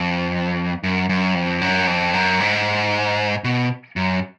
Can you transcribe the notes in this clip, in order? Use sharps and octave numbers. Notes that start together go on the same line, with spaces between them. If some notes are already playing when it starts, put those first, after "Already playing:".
Already playing: F2
F#2
F#2
F2
F#2
F2
F#2
G#2
B2
F#2